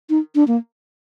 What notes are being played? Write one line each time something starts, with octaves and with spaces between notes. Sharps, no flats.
D#4
D4
A#3